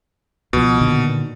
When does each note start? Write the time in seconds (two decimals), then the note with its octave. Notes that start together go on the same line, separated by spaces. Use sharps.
0.53 C#2 B2 F3
0.81 A#2 D3 D#3